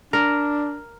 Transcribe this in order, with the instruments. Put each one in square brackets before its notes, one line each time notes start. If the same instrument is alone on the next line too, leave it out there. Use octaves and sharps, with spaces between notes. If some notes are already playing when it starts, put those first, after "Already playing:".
[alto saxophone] D4 [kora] A#4